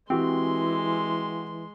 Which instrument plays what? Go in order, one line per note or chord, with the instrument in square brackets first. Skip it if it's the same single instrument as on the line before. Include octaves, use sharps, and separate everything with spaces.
[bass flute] E3 [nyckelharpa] G#3 C6 [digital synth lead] C4 [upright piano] F#4 G4